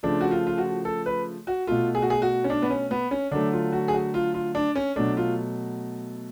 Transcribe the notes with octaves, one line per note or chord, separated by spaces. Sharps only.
C#3 F3 A3 D4
F#4
F4
F4
F#4
A4
B4
F#4
B2 A3 F4
G#4
F#4
G#4
F#4
C#4
D4
B3
C#4
B3
C#4
D3 F#3 A3 D4
F4
F#4
G#4
F#4
F4
F4
D4
C#4
B2 F#3 A3 D4
F4